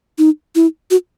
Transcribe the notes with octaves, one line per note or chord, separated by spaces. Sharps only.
D#4
E4
F#4